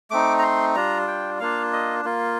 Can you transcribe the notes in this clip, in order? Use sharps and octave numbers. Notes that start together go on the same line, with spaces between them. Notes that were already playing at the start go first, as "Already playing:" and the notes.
A3 C4 D#4 D6
A#5
C6
G3 D4 F4 A#5
G5
A#3 D4 F4 F5
D#5
A#3 F4